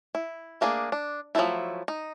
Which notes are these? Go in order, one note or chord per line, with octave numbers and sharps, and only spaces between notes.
E4
A3 A#3 D4 G#4
D4
F3 F#3 G#3 A3 E4
D#4